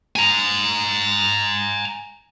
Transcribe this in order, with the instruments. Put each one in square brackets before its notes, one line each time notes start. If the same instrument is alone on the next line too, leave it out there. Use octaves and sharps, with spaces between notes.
[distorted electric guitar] G#5 A#5